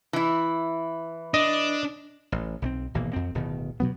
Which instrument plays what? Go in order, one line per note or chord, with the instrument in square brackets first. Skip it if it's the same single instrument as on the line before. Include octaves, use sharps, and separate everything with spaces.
[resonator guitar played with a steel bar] E3 E4
[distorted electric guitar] D4 [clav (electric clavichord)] D#5
[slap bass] A1
B1 F3 C4
G#1 B2 E3 A#3
F2 C4
D1 B2 D#3
G2 B2 F#3 B3